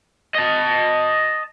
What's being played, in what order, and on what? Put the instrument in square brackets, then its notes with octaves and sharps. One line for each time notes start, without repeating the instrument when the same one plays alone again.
[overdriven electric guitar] D#5 A5